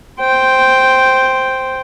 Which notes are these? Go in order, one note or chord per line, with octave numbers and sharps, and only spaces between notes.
C5 G5